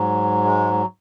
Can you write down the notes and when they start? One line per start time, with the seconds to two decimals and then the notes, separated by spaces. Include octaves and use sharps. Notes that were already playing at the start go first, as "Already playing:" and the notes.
Already playing: G#2 F#3
0.44 G#3